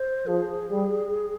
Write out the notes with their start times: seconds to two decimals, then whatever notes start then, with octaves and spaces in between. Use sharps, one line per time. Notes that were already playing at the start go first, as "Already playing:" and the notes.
Already playing: C5
0.27 F3 G#4
0.71 G3